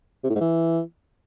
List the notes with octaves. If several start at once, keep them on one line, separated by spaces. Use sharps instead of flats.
C3
A2
G#2
E3